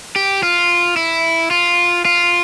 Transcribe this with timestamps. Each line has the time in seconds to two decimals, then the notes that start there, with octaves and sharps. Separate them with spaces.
0.16 G4
0.43 F4
0.96 E4
1.51 F4
2.05 F4